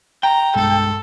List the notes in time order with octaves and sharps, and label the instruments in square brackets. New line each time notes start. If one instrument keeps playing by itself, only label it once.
[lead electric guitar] G5 [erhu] A#5
[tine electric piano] B1 G2 G#3 [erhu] A4